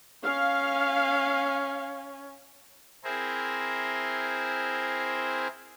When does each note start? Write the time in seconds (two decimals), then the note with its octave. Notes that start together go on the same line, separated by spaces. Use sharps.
0.24 C#4 F5
3.04 C4 E4 G#4 A#4 C5